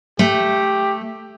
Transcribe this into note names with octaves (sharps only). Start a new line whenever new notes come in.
A3 G4